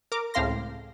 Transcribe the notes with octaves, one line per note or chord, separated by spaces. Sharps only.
A#4 D6
C#2 A2 C4 F5 C6 A#6